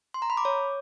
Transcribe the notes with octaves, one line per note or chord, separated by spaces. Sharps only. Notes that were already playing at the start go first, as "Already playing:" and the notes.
C6
A#5
B5
D6
C#5